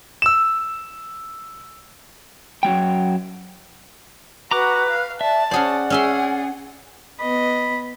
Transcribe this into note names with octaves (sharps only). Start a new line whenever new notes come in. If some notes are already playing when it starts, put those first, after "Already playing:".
E6 E7
F#2 F#3 G3 G5
F#4 B4 A#5 D6 F#6
F5
D5 E5 A5
C#4 G#4 C5 D5 F#5
C#4 G#4 E5 C6
B3 D#5 B5